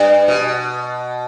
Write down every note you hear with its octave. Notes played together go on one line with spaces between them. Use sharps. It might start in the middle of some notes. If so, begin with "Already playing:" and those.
Already playing: G2
B2